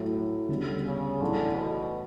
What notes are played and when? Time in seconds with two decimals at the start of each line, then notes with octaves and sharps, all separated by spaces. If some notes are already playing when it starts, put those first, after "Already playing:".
Already playing: A2 F#3 A3
0.49 D2 C#3 G3 B3
0.86 C#3
1.21 B1 A2 D3 E3
1.57 B2